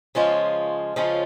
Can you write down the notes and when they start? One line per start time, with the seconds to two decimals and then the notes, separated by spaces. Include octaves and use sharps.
0.15 C#3 F3 G#3 C#4 F4
0.96 C#3 F3 G#3 C#4 F4